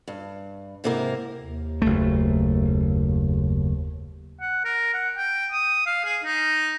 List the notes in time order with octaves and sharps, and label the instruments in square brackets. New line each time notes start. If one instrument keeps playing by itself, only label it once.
[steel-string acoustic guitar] G2
G#2 C3 A#3 E4 A#4
[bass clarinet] D#2
[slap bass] F#1 A3
[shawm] F#5
A#4
F#5
G5
D#6
F5
G#4
D#4